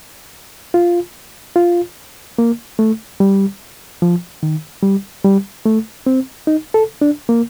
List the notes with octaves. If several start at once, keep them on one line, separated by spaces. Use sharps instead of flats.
F4
F4
A#3
A3
G3
F3
D#3
G3
G3
A3
C4
D#4
A4
D4
A#3